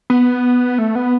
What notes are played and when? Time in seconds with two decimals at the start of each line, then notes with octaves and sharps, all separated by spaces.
0.10 B3
0.78 A3
0.95 B3